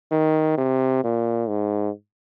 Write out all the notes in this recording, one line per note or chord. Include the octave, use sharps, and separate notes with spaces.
D#3
C3
A#2
G#2